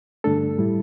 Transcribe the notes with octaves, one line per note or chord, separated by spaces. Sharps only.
G2 D3 A3 D4 A4
A2 G3 E4